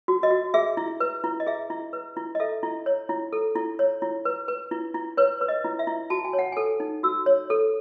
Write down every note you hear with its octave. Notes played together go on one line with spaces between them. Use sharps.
F#4
D#5
F#4
G#4 E5
E4
B4
E4
D#5
G#4 E5
E4
B4
E4
D#5
A4 E5
E4
C#5
E4
A4
E4
C#5
E4
B4
B4
E4
E4
B4 C#5
B4
D#5
E4
E5
E4
F#4 A5
G#5
C#5
F#5
A4 G#5
D#4
F#4 E6
C#5
A4